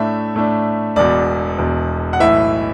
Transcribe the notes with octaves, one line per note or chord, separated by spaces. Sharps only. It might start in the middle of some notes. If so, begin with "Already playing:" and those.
Already playing: A2 A3 D4 E5
A2 A3 D4
E1 E2 B2 D5
E1 E2 B2
F#5
B1 A2 E3 E5